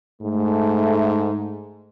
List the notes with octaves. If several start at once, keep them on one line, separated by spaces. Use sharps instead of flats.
G#2 A3